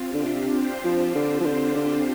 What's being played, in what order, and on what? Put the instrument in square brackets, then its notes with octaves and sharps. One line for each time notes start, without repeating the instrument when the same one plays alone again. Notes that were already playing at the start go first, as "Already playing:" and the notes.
Already playing: [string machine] C4 F4
D4 G4
[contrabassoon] D3
C3
[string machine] G4 C5
[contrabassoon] F3
D3
F3
D3
D3